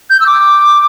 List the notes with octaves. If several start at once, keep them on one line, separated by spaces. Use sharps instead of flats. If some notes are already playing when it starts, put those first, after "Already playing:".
G6
E6
D6